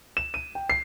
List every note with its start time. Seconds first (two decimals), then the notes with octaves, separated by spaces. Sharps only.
0.17 E7
0.34 D#7
0.55 G5
0.70 C7